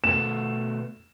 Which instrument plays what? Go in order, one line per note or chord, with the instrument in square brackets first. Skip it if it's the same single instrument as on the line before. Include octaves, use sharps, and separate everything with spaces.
[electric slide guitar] B2 A3 B3 [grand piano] E7